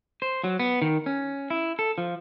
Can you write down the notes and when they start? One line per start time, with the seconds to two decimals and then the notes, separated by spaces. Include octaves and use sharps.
0.22 C5
0.44 F#3
0.60 B3
0.82 D#3
1.06 C#4
1.50 E4
1.79 A4
1.98 F3